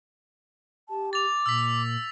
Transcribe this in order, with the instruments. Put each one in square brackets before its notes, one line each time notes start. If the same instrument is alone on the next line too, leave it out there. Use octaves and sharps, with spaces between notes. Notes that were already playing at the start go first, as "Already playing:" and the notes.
[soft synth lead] G4 [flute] A5
[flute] D6 [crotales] A6 F7
[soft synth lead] A#2 [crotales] E6 B6